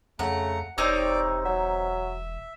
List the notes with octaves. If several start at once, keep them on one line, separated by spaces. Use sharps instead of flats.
F2 C#3 A3 F#5 A#5
E1 C3 C4 D#4 C#5 D5 D6
F#3 E5